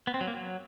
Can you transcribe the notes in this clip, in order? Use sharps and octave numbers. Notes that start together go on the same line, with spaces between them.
B3
C4
F#3
A#3
F#3